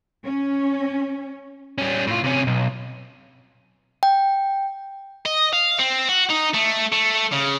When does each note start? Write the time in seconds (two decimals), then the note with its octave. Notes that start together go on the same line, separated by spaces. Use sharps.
0.24 C#4
1.78 G3 C#4
2.07 A2 F4
2.24 C3 C#4
2.47 B1
4.03 G5
5.26 D#5
5.53 F5
5.79 C4
6.09 F#4
6.30 D#4
6.54 A3
6.92 A3
7.32 C#3